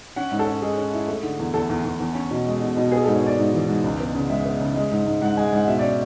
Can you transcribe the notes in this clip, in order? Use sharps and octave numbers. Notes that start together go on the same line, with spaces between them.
C#4 F#5
G#2
A4
C#4
G#3 G#4
C#4
E4
A3
D3
E2
E2 A4
E2
E2
E2
C#4
B2
G#3
B2
B2
B3 G#4
G#2 A4
C#5
B3 D5
G#2
E3
G#2
C#2
B3
C#3
G#3 E5
B3
C#3
G#3
G#2
G#2
G#2 F#5
G#3 G#5
G#2 F#5
B2 E5
C#4 D5